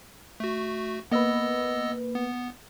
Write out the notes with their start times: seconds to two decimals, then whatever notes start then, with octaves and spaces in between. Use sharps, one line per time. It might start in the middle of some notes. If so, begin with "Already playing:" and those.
0.40 A3 F#4
1.11 A#3 B3 B4 D#5 E6
2.14 B3